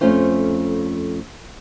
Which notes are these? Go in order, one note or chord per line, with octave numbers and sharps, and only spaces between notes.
F2 A3 C#4 F4 C5